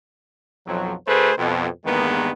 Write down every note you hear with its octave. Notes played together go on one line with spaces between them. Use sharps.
B1 F2 F3 F#3
D2 A3 G#4 B4 C5
F2 B2
E2 G2 D#3 G#3 A#3 B3